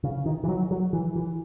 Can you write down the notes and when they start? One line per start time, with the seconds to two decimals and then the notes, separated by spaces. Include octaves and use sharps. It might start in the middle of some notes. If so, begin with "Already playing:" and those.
0.03 C#3
0.26 D#3
0.44 E3
0.48 F#3
0.71 F#3
0.93 E3
1.15 E3